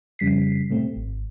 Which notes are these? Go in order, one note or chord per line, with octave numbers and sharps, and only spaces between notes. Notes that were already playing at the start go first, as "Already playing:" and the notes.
F2 C#3 G3 B6 C7
A2 C3 A3 C4
G#1